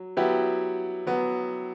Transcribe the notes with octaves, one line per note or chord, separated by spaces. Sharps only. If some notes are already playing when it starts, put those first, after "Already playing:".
Already playing: F#3
F#3 B3 E4 G4
F#3 B3